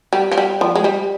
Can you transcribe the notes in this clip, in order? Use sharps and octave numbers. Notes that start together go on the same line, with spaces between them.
G3
F3
G3
F3
G#3
G3